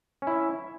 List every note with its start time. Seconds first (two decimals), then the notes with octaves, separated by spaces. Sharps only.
0.22 C#4
0.27 E4
0.32 E5